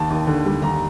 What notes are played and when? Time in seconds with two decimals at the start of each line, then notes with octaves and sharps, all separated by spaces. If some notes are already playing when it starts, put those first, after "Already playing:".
Already playing: D#2 A5
0.10 D#2
0.27 D3
0.46 G3
0.62 D#2 A#5